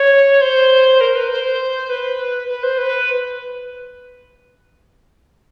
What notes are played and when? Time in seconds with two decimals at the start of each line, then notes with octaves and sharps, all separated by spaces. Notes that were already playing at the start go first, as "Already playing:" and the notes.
Already playing: C#5
0.41 C5
1.01 A#4
1.16 B4
1.30 C5
1.90 B4
2.49 B4
2.63 C5
2.78 B4